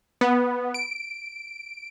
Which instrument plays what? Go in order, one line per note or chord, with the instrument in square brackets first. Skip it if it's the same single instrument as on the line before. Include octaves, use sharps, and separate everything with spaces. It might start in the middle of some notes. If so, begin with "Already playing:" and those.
[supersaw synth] B3
D7